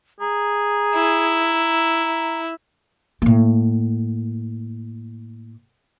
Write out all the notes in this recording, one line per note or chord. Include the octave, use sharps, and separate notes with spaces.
G#4 A#5
E4
A2 A#3